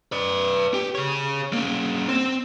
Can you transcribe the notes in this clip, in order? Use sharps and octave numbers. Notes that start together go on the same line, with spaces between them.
B4 D5
G4
G#4 C#5
A#3 C#4
C4